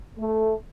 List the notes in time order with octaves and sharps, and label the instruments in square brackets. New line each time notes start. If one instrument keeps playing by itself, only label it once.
[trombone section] A3